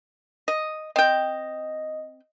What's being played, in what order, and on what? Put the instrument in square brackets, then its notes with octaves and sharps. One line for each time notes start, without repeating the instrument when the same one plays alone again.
[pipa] D#5
[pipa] C4 G5 [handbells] D#5